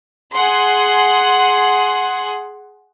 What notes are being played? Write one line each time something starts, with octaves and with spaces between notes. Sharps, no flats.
G#4 F#5 C6